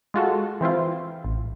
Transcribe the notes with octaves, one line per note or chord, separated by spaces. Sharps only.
G#3 F4 F#4 A4
E3 C4 E4 F4
A1